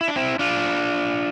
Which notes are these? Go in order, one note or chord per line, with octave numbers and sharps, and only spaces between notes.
E4
D4
C4 E4
D4 F4